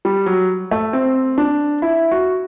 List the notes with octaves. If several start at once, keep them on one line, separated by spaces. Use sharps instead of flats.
G3
F#3
A3
C4
D4
E4
F#4